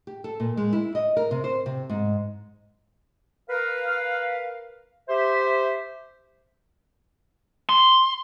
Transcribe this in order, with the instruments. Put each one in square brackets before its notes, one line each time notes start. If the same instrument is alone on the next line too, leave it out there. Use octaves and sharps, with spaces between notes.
[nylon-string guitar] G4
A4
A#2
G#3
E4
D#5
A#4
C3
C5
C3
G#2
[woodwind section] A#4 B4 F5
G4 C5 E5
[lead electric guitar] C6